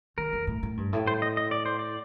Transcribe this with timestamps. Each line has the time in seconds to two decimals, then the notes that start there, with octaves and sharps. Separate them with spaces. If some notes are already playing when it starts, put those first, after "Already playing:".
0.18 D#3 A#4
0.33 F2
0.47 A2
0.63 A2
0.77 G2
0.93 A2
1.07 C5
1.22 D#5
1.37 D#5
1.51 D5
1.66 C5
1.79 D5